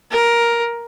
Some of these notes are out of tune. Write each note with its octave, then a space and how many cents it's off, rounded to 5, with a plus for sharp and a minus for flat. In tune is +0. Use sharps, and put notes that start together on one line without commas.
A#4 +10